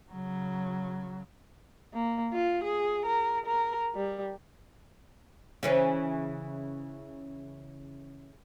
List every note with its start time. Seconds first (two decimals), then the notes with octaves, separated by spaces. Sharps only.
0.12 C#3 F#3
1.94 A#3
2.33 F4
2.64 G#4
3.06 A#4
3.46 A#4
3.95 G3
5.63 C#3 E3 C#4